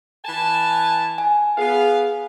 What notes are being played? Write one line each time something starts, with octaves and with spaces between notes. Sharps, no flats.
E3 G#5 A5
G#5
B3 G#4 F5